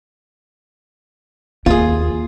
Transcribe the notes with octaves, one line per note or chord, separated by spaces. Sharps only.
D#2 A#3 F4 G#4